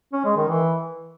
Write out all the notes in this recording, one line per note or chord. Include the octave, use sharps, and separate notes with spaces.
C#4
G#3
D#3
E3